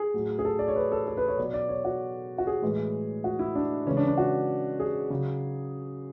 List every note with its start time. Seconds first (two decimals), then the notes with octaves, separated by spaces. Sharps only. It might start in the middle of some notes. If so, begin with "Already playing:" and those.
Already playing: G#4
0.14 A2 F#3
0.39 G#4
0.45 A4
0.59 D5
0.68 C#5
0.76 B4
0.92 A4
1.07 A4
1.17 B4
1.28 C#5
1.38 B2 F#3 D5
1.54 D5
1.69 C#5
1.85 F#4
2.38 F#4
2.47 G#4
2.62 A2 E3 G#3
3.24 F#4
3.39 E4
3.55 D4
3.86 C#3 E3 G#3 C#4
3.97 D4
4.07 D4
4.18 F#4
4.80 G#4
5.10 C#3 F#3